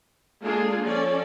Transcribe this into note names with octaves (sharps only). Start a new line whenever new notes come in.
G#3 A#3 D4 F4 G#4 A4
F3 C#4 A4 D5